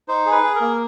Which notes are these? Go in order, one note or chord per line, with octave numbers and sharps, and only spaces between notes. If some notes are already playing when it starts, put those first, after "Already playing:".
D#4 C5
G#4
B4
G#4
A#4
A#3